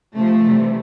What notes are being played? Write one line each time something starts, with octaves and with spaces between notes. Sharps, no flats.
C3 F3 A3
C3 E3 G3